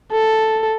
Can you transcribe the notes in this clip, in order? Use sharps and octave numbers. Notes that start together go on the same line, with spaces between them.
A4